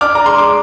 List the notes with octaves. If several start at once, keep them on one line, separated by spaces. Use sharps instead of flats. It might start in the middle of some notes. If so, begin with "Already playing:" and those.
D4 D6 F6
A#5
G#3 C6
D6